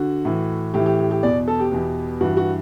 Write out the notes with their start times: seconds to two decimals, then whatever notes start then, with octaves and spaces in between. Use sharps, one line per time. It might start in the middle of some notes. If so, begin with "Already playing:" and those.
Already playing: D3 F#4
0.25 A2 E3
0.74 A2 E3 G4
0.86 G4
0.99 G4
1.11 G4
1.23 E2 B2 D5
1.48 A4
1.60 G4
1.72 E2 B2
2.21 G2 E3 F#4
2.37 F#4